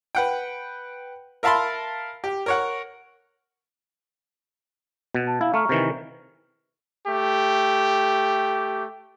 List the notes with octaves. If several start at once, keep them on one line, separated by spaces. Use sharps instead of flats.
B4 F#5 G5
A#4 E5 F5 A5 B5 C6
G4
A#4 C#5 F#5
B2
A5
E4 F5
A3 A#5 C#6 F6
C3 D#3 E3
A3 G4